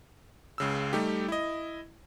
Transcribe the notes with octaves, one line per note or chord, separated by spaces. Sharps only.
C#2 C#3 E6
G3 A3 D#4 G4
E4 D#5